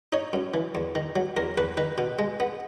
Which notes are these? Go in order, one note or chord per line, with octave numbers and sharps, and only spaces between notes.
D#4 C#5
F#2
E3
E2
D#3
F#3
E2 A#4
E2 B4
D#3 B4
B2
G#3
B3